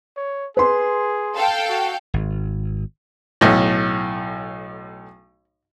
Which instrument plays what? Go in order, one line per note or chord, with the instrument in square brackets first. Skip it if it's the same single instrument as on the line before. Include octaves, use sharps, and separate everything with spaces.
[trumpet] C#5
[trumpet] G#4 [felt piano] B4 C6
[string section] A4 F5 G5
[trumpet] F#4
[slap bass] G#1
[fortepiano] B1 A2